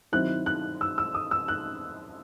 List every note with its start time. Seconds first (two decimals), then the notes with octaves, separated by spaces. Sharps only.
0.12 D#3 F#3 C4 E4 F#6
0.46 F#6
0.81 E6
0.98 E6
1.14 D#6
1.31 E6
1.48 F#6